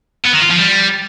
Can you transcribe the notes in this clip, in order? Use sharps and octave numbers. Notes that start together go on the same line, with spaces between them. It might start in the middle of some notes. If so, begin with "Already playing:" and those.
B3
D#3
F4
F3
G3